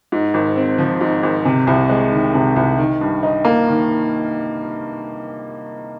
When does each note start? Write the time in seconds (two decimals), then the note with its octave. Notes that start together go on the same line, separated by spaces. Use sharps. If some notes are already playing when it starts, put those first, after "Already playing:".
0.12 G#2
0.34 G#1
0.56 C4
0.78 F3
1.01 G#2
1.23 G#1
1.45 C3
1.67 C2
1.89 G#3
2.12 D#3
2.34 C3
2.56 C2
2.79 D#3
3.01 G2
3.23 D#4
3.45 A#3
3.68 D#3